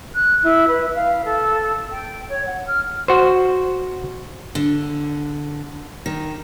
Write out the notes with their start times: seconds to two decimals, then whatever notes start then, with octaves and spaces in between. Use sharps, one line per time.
0.14 F#6
0.43 E4
0.67 B4
0.95 F5
1.24 A4
1.91 G5
2.28 C#5
2.46 F#5
2.67 F6
3.08 F#4 C5
4.55 D3
6.06 D#3